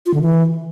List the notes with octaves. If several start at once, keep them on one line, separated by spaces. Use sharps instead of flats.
F4
D3
E3